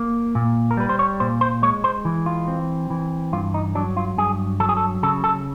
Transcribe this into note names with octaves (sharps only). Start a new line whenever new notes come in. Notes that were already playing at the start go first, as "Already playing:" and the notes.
Already playing: A#3
A#2
A#4
G3 B4
C5
C#5
A#2 C5
C5
G#3 C#5
C5
E3
F4
C4
E3
G2 F4
D#4
F#3 D4
F4
G2 G#4
F#3 A4
G#4
A4
C#3 A4
A4